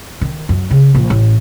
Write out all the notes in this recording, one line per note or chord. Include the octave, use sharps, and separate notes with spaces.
D#3
F#2
C#3
A#1
A1